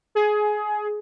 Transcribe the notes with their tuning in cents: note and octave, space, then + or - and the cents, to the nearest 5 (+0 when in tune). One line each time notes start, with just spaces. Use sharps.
G#4 +20